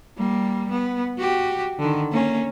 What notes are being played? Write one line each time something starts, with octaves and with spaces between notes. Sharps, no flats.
G3 A#3
B3
F#4 G4
D3 D#3
A#3 C#4